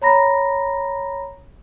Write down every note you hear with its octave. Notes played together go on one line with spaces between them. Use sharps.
C#5 A#5 B5 A#6